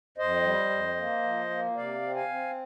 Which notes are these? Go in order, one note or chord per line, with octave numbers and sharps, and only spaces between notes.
F2 C5 D#5
G3
F2
A#3
F3
A#3
C3 D5 F5
C4
F5 G#5
C4